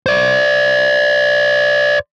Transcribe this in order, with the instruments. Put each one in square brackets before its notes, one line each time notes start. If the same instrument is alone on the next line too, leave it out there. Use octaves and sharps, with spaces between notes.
[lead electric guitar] C5 D5